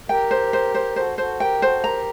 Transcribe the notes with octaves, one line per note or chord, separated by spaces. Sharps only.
G4 A#4 G5
C5
C5
C5
F#4 A4 C5
F#4 A4 C5
G4 A#4 G5
F#4 A4 C5
G4 A#4 A#5